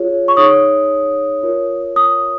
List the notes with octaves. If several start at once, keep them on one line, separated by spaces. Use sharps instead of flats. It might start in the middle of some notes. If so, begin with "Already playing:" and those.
Already playing: F4 G#4 C#5
C#6
D#4 G#4 C#5 D#6
F4 A#4 C#5
D#6